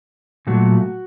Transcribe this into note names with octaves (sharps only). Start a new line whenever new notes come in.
A#2 F#3 A3 F#4